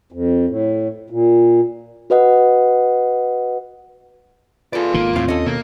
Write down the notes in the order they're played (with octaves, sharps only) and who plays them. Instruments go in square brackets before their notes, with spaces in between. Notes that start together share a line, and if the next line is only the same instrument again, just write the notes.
[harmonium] F2
A2
A#2
[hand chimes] F#4 B4 D#5 F#5
[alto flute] F4 [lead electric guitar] G#4 D5 [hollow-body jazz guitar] A4 B4
[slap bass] G#1 B2 D#3 [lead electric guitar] A#3
[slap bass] D#2 C4 [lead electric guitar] A2 [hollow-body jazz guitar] F5
[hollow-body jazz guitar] C#4 A4 [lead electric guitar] D#5
[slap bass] B2 D#3 [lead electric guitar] A#3